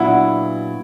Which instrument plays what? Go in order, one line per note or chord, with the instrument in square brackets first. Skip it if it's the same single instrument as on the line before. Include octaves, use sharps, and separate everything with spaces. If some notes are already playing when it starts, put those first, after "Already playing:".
Already playing: [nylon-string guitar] A#2 F#3 B3 D4 F#4 [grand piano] E4